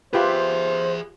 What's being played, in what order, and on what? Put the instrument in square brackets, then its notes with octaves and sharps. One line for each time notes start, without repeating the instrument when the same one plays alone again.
[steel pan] F4 G4 B4 [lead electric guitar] G#4 E5 [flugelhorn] C5